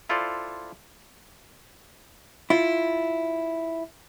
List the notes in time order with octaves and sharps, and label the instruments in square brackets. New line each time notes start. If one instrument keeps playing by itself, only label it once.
[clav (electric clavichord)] E4 F4 A4 C5 D5
[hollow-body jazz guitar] E4 F4